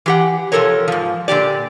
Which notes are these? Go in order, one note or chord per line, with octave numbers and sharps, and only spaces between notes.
E3 G4 F#5
C3 F3 B3 A4 A#4 C#5
G#2 F3
A#2 D3 G4 D5